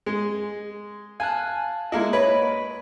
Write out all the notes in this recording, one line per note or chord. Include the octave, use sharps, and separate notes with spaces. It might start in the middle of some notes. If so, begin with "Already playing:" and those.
G#3
F5 G#5 A5 F#6
G#3 A#3 E4 D#5
B4 C#5